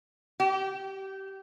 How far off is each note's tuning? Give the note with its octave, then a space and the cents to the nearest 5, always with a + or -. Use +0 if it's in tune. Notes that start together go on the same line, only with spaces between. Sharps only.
G4 -20